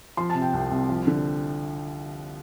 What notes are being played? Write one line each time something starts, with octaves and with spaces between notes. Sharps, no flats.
F3 C6
A5
C3
G5
C2
C2
F3
D3